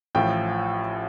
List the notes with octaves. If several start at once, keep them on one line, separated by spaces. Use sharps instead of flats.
A1 A2 F3 G5